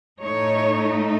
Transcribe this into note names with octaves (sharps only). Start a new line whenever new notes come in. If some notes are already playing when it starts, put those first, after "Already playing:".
A2 A3 D#4 C#5